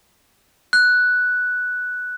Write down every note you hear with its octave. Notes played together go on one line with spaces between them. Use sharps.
F#6